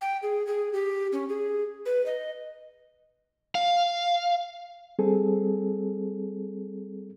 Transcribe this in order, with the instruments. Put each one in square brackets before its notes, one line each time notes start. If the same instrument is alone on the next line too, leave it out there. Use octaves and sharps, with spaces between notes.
[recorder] G5
G#4
G#4
G4
C#4
G#4
B4
D#5
[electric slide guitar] F5
[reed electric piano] G3 C4 G#4 A4